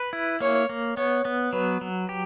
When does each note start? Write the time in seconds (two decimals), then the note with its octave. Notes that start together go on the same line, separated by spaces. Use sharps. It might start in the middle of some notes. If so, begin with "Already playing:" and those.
Already playing: B4
0.13 E4
0.40 A#3 C#5
0.69 A#3
0.97 B3 C#5
1.25 B3
1.52 F#3 B4
1.81 F#3
2.09 G4